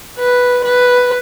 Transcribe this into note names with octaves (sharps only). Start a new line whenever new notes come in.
B4
B4